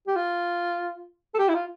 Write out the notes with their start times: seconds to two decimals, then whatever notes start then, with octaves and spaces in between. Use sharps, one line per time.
0.07 G4
0.16 F4
1.34 A4
1.38 G4
1.48 E4
1.54 F4